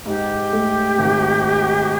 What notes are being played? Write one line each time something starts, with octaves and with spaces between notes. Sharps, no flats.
G#2 G4
A3
G#1